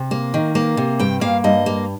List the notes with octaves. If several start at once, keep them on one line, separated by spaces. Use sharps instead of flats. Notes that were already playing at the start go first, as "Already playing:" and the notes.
Already playing: C3
A#3
D#3
A#3
C3
G2 G5
A#3 F5
G2 D#5
A#3